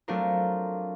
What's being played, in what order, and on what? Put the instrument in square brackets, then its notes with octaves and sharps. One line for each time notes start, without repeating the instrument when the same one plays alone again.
[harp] F#3 A3 C4 D4 F4 A#4